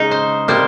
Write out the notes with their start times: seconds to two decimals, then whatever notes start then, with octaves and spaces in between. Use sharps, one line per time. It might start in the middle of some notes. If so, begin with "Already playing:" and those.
Already playing: C#3 G#3 D#4
0.11 C5
0.48 C3 G3 A#3 C5